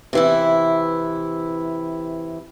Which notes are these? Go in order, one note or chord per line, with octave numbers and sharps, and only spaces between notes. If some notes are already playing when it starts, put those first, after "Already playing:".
C3 E3 E4